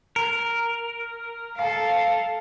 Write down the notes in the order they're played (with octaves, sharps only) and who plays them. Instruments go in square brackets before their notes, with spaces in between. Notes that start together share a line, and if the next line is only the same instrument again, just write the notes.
[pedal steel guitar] A#4
[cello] A4 F5